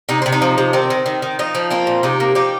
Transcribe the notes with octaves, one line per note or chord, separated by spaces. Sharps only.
C3 D#4
C3 C4
D#4
F3
C3
D#3 C4
D#3
D#3
D#3
F3 D#4
F3
A#3 C4 F4
A#2
C3 D#4 G4
A#3
F3 D#4 G4